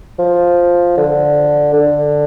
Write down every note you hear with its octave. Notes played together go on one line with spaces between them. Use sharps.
F3
D3
D3